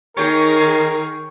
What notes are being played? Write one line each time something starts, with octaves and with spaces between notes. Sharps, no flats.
D#3 D#4 G#4 A#4 C#5 G5